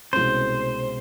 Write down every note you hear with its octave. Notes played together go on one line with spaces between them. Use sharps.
C2 B2 G#3 C#4 C5